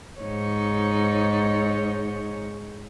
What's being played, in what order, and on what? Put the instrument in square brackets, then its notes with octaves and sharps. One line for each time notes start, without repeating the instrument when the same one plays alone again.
[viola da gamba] G#2 D#4 C#5